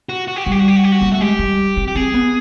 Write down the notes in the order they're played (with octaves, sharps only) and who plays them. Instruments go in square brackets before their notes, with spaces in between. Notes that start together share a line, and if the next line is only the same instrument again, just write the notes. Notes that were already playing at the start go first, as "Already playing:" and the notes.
[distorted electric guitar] F#4
F#4
G4
[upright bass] G3 [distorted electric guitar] F#4
[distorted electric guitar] G4
F#4
G4
F#4
G4
F#4
[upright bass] A#3
[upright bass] A3 [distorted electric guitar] F#4
[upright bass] G#3 [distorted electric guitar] G4
[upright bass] G3
C4
[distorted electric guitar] G4
[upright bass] C4 [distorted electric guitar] G#4
[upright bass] B3